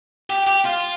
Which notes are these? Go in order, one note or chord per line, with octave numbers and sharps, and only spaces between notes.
G4
G4
F4